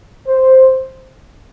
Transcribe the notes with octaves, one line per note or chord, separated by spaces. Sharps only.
C5